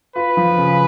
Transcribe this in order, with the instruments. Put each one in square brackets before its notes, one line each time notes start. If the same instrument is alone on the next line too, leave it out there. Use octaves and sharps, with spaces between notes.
[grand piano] F4 [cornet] B4
[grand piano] F3
C#3